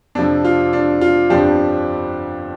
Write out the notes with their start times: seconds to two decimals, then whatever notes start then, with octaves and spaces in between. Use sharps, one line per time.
0.15 F2 C3 F3 D4
0.45 F4
0.73 D4
1.01 F4
1.30 G1 F2 F3 D4 G4